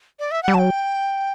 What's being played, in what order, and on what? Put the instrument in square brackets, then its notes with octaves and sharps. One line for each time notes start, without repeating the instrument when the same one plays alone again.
[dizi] D5
E5
F#5
[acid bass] G3
[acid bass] F#3 [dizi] G5 A5